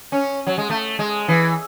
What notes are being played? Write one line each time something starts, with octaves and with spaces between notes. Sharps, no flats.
C#4
F#3
G#3
A3
G#3
E3